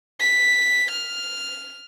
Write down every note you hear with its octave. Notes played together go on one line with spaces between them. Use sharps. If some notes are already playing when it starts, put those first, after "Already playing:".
B6
F6